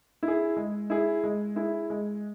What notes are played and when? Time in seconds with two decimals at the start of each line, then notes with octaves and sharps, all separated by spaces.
0.23 E4
0.28 G#4
0.57 G#3
0.90 E4 G#4
1.24 G#3
1.56 E4 G#4
1.90 G#3